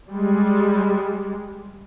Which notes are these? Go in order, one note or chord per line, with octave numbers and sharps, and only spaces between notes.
G3 G#3